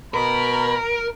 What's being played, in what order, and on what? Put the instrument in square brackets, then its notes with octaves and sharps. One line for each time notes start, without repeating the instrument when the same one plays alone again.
[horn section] B2 B5 [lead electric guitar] A#4